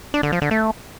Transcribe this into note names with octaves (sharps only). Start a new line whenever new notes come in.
D4
D3
F3
D3
A3